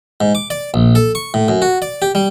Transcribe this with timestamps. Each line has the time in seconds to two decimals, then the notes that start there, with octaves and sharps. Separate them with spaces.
0.21 G#2
0.35 D6
0.50 D5
0.74 A#1
0.95 A4
1.15 C#6
1.34 A2
1.48 F#2
1.62 F#4
1.82 D5
2.02 G4
2.15 G3